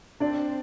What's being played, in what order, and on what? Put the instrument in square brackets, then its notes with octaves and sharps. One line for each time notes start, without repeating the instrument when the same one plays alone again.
[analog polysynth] C4 [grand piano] D4 D5